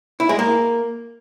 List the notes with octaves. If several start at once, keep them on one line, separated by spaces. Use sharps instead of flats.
E4
G#3
A#3